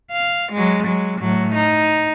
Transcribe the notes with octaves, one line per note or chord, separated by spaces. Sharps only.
F5
F#3 G#3
F#3 G#3
A2 F#3
D#4